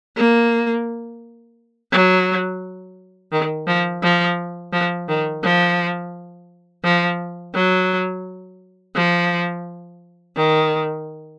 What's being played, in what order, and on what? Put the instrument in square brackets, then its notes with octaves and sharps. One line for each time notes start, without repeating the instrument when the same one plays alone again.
[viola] A#3
F#3
D#3
F3
F3
F3
D#3
F3
F3
F#3
F3
D#3